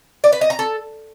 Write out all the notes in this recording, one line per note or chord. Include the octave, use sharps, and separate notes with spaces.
D5
B4
D#5
A#5
A4